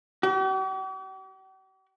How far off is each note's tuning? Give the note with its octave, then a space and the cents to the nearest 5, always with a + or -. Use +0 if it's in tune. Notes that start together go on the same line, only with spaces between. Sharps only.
G4 -45